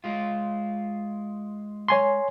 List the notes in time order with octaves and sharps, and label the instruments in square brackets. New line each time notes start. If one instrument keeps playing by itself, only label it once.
[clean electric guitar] G#3 F4
[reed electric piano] C#5 G#5 C6